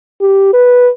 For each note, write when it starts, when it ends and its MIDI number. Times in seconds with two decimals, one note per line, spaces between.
0.21 0.50 67
0.53 0.89 71